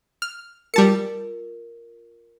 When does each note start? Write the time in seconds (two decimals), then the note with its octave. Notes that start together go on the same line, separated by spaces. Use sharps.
0.22 F6
0.74 G3 F4 A#4 A5 C#7